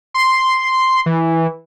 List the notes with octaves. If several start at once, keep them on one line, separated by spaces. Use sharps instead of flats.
C6
E3